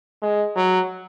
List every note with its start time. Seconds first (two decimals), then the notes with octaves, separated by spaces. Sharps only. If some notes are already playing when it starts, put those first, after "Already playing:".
0.22 G#3
0.56 F#3